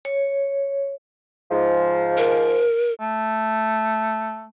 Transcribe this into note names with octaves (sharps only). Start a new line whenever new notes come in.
C#5
G#2 F3
A#4
A3